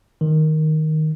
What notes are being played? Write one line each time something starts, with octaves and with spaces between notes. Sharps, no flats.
D#3